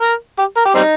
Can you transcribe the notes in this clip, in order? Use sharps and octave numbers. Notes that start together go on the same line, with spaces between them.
A#4
G4
A#4
G4
G3 C4 D#4